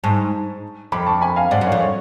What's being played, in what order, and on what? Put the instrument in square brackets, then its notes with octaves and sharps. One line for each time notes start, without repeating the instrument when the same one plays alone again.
[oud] G#2 [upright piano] A5 C#6
[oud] F2 [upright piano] B5 D6
[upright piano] A5 C#6
G#5 B5
F5 G#5
[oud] G#2 [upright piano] D5 F#5
[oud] F#2
[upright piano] C#5 F5
[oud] F2
[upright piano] C#5